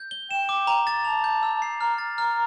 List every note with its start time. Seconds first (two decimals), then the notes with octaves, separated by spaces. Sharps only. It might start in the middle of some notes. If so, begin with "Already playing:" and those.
Already playing: G6
0.11 G7
0.30 G5 E7
0.49 D6
0.67 A#5
0.87 A6
1.04 A5 F7
1.24 G6
1.43 E6
1.62 C7
1.80 A#5 F6
1.98 A6
2.18 A#5 F6